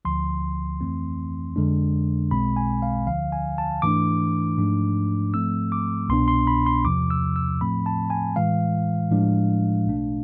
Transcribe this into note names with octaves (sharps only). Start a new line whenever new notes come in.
D2 D3 F3 C6
F2 E3 A3 C4
F2 D3 G#3 D4
B1 B2 G#3 C4 B5
G#5
F5
D2 D3 F3 F5
G#5
A5
G#2 E3 A3 D4 D6
G#2 F3 A3 D4
G#2 F3 A3 C4 E6
D6
C2 B2 B3 D4 C6
C6
B5
C6
E2 C3 F3 D6
E6
E6
A2 F3 A3 C4 B5
A5
G#5
A2 E3 G#3 F5
A2 F3 G#3 D4
B1 B2 A3 D4